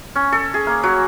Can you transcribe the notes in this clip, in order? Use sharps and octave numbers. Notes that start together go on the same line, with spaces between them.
C#4
A4
G#4
A#3
F#3